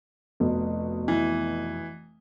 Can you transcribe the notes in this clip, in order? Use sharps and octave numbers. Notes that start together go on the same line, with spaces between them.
F1 B2
E3